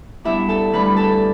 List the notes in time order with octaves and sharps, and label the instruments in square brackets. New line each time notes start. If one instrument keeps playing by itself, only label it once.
[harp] G2 G3 B3 D4 E4 E5
A4 A5
D2 D3 G3 D4 B4 B5
B5
A4 A5